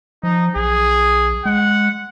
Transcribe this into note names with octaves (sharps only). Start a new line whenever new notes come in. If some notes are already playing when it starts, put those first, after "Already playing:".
F3 D#4
B1 G#4
G#3 F#5